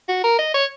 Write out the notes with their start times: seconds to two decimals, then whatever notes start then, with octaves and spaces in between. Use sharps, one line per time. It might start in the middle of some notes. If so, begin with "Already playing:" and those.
0.08 F#4
0.24 A#4
0.39 D#5
0.54 C#5